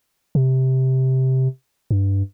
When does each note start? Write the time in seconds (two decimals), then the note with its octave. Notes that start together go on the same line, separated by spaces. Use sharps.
0.35 C3
1.91 G2